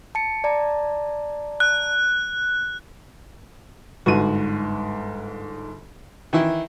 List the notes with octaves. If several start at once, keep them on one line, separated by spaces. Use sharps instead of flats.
A5 C#7 D7
D5 A5 A#5
F#6
G1 G#2 F#4 D#7
D#3 E3 E4